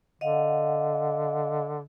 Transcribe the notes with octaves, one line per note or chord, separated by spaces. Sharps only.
D3 D#5 F5 F#5